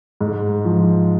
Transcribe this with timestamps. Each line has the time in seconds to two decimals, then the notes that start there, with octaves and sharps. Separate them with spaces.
0.21 G#2
0.65 F3